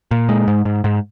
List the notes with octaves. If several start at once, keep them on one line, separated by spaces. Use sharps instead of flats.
A#2
G#3
G#2
G#2
G#2